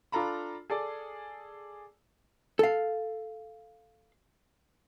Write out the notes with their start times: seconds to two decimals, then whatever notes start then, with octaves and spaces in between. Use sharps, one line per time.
0.12 D4 F4 A4 A#5 B5
0.70 G#4 A4 D5
2.59 A4 F5